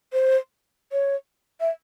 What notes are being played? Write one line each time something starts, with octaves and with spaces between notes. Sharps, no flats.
C5
C#5
E5